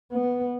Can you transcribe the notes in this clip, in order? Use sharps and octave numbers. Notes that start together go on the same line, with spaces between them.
B3